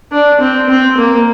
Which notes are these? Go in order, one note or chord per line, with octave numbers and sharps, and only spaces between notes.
D4
C4
C4
A#3